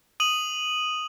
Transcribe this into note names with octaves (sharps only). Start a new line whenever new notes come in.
D#6 D#7 F#7